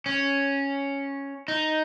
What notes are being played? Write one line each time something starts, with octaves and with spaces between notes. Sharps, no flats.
C#4
D#4